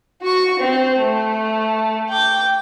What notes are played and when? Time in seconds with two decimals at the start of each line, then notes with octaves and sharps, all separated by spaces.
0.22 F#4 C#6
0.59 C4
0.99 A3
2.09 G5 D6